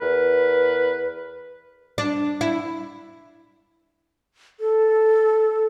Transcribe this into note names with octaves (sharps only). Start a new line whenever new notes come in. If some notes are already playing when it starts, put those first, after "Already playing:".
E2 A#4 B4
D4
E4
A4